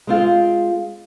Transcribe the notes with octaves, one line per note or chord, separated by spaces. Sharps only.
G#3 C4 F4